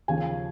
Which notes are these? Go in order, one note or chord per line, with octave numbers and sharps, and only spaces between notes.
D#2 C#3 F3 A#3 G#5